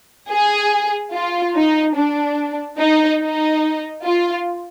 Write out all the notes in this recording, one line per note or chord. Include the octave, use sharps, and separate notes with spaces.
G#4
F4
D#4
D4
D#4
D#4
F4